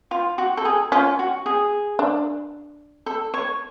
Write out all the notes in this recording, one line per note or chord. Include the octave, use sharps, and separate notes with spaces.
F4
F#4
A4
G#4
C#4 F4
F#4
G#4
D4
A4
C#5